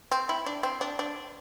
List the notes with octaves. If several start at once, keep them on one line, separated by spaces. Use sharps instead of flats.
C4
E4
D4
C4
D4
D4